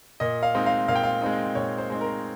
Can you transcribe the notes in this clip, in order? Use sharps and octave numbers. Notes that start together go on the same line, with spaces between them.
A#2 D#5
F5
G#3 C4 D#4
F5
A#2 F5
G5
F5
G#3 C4 D#4
A#2 C#5
C5
G#3 C4 D#4
A#4